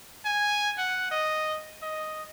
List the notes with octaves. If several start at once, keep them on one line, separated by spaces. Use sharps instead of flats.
G#5
F#5
D#5
D#5